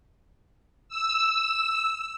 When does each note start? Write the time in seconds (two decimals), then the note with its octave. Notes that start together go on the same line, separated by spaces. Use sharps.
0.88 E6